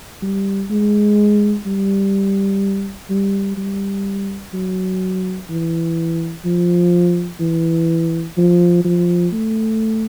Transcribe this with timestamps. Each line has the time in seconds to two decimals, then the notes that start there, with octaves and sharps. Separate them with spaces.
0.22 G3
0.70 G#3
1.66 G3
3.10 G3
3.57 G3
4.53 F#3
5.49 E3
6.45 F3
7.40 E3
8.37 F3
8.84 F3
9.32 A3